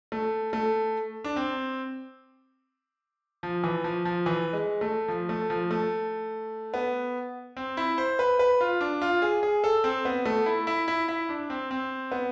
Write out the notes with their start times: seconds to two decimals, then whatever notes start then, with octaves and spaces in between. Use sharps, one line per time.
0.12 A3
0.53 A3
1.24 D4
1.36 C4
3.43 F3
3.64 E3
3.84 F3
4.05 F3
4.26 E3
4.53 G#3
4.81 A3
5.08 F3
5.29 A3
5.50 F3
5.71 A3
6.74 B3
7.57 C4
7.77 E4
7.98 C5
8.19 B4
8.39 B4
8.61 F4
8.81 D4
9.02 F4
9.22 G#4
9.43 G#4
9.64 A4
9.84 C4
10.05 B3
10.26 A3
10.46 E4
10.67 E4
10.88 E4
11.08 E4
11.29 D4
11.50 C4
11.71 C4
12.12 B3